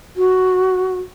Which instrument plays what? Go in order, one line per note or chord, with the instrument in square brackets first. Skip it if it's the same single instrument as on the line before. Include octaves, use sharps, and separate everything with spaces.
[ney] F#4